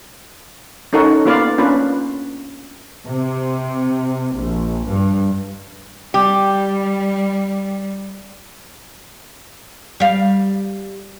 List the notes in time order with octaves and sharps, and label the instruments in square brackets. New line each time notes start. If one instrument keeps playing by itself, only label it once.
[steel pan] C#4 D#4 A4 A#4 C#5 F#5
A#3 B3 F4 B4 D5 F5
A#3 C#4 D4 F4 B4
[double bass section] C3
A#1
G2
[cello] G3 [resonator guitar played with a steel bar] G4
[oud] G3 F5